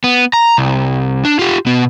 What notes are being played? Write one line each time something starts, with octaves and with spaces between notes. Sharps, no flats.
B3
A#5
C2
D4
F4 G4
B2 B3